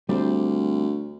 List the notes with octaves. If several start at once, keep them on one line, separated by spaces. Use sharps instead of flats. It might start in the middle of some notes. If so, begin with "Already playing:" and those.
D2 G3 C4 C5